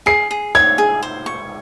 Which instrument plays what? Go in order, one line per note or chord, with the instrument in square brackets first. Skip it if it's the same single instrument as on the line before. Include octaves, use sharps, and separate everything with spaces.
[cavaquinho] G#4 [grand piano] C7
[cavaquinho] G#4
[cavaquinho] C#5 [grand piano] G#6
[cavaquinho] G#4
C5
C#6